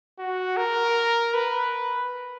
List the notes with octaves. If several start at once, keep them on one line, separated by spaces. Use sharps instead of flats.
F#4
A#4
B4